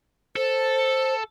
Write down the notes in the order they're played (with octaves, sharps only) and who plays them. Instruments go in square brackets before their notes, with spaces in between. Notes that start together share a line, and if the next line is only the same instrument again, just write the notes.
[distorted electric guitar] A4 [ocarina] C5